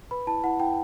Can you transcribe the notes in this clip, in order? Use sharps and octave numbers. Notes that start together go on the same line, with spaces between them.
B4 B5
E4 A5
E4 F#5
E4 G5